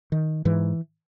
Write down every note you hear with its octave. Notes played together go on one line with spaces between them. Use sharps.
D#3
G#2 E3